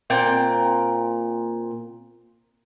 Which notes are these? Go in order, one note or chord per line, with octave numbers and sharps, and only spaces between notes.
A#2 C4 G5